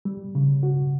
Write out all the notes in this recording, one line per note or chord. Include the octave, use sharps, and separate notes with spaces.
G3
C#3
F#4